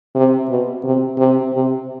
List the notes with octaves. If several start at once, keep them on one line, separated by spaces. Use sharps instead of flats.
C3
B2
C3
C3
C3